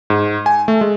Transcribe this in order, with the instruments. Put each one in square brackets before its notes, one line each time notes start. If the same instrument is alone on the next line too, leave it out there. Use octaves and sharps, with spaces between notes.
[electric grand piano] G#2
G#5
A3
G#3